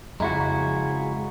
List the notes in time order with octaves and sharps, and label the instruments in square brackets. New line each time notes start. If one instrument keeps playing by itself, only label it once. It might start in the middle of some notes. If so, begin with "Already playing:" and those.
[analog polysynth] F2 [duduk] C#3 [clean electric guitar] G#3 E4 F#4 [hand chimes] A#5